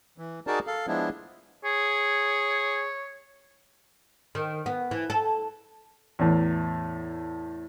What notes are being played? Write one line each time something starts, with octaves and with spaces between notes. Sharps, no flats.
E3
D#4 F#4 G#4 A#4 D5 A5
A4 F5
F3 G#3 B3 D4 E4
G#4 C#5
D#3
B3
E3
A4
E2 A2